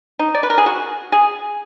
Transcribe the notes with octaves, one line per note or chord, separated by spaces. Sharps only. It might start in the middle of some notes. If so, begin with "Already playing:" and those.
D#4
D5
B4
A#4
G#4
F#4
G#4